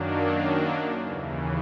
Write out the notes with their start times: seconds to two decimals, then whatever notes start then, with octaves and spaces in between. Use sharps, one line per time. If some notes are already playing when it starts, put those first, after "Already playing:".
Already playing: F#2 D#3 F#3 A#3 D4
1.02 D#2 C#3 E3